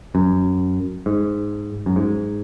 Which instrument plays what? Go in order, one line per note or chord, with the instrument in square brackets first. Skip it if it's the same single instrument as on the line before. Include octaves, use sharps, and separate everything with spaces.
[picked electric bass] F#2
G#2
F#2
G#2